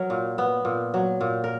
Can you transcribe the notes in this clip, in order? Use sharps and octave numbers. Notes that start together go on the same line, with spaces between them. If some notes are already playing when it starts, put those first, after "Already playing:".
Already playing: F#3 A#4 C#5
A#2
B3
A#2
F#3
A#2
A#4